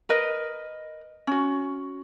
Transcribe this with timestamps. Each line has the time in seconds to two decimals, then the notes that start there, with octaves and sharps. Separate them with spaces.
0.09 A#4 B4 D#5
1.27 C#4 F#4